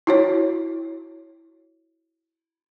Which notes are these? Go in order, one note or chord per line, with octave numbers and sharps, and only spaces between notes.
E4 F#4 C#5